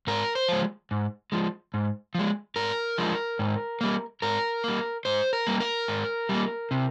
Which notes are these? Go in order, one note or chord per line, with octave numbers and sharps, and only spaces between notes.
G#2 A#4
C5
F3 G#3
G#2
F3 G#3
G#2
F3 G#3
G#2 A#4
F3 G#3
G#2
G3 A#3
G#2 A#4
G3 A#3
G#2 C5
A#4
G3 A#3
A#4
G#2
G3 A#3
C3